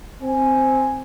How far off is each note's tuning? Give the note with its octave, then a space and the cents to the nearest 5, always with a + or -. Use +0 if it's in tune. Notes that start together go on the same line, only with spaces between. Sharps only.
C4 +0 G#5 +0